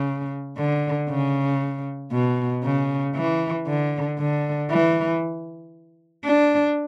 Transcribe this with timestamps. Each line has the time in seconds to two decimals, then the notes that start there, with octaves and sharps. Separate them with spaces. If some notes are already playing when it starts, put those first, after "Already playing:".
Already playing: C#3
0.57 D3
1.10 C#3
2.12 B2
2.64 C#3
3.15 E3
3.67 D3
4.19 D3
4.71 E3
6.25 D4